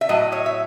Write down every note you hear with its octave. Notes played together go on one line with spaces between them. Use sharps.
E5
A2 F#3 D#5
C#5 D#5
E5